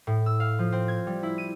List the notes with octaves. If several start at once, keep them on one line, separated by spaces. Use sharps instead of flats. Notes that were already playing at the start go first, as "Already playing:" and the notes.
A2
E6
F5
F3
C4
G#6
G3
E4
D#7